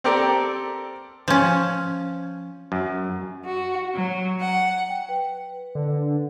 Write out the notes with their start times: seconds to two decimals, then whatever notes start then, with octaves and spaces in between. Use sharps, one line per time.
0.04 C4 G4 A4 A#4 D5
1.28 F3 C#4
2.72 F#2
3.45 F#4
3.94 F#3
4.41 F#5
4.89 G5
5.09 B4
5.75 D3